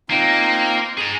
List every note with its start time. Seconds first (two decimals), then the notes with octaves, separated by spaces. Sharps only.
0.10 A#3 C4 D#4 F4
0.98 G#4 A#5